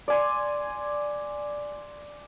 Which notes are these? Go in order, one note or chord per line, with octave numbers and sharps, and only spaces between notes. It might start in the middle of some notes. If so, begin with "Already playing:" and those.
D5 G#5 C6